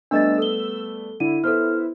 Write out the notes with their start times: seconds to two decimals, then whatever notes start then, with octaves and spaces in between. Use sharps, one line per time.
0.11 G3 A3 B3 D4 D#5 E6 A6
0.38 A4 G7
1.20 D3 E4 D#7
1.44 B3 A4 C5 E5 F6